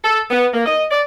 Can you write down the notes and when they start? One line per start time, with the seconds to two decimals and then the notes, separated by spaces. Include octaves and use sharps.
0.04 A4
0.31 B3
0.53 A#3
0.66 D#5
0.91 D5